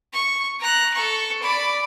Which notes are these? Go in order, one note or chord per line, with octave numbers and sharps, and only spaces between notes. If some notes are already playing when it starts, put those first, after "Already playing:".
C#6
A#5 F#6
A4 C#6
D5 B5